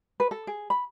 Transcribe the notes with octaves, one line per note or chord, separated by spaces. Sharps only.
B4
A4
G#4
B5